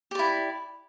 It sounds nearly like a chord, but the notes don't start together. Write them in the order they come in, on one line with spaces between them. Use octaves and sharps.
G4 D5 E4